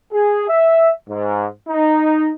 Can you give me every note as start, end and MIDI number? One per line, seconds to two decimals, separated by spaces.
0.12 0.48 68
0.49 0.89 76
1.08 1.46 44
1.68 2.31 63